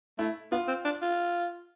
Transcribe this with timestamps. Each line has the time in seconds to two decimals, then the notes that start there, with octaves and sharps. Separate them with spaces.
0.19 A3 E4
0.52 B3 F4
0.68 C4
0.85 D4
1.02 F4